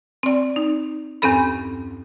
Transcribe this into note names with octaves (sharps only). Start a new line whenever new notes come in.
C4 D5
D#4
E2 G2 C4 C#4 A4 B5